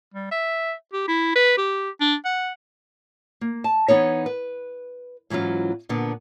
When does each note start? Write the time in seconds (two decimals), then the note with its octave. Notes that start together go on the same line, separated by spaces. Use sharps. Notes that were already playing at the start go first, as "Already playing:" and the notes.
0.14 G3
0.31 E5
0.93 G4
1.08 E4
1.35 B4
1.57 G4
2.01 D4
2.25 F#5
3.41 A#3
3.64 A5
3.88 E3 B3 D#4 C#5
4.26 B4
5.30 G#2 E3 F#3 C#4 F4
5.89 A#2 D3 B3 D4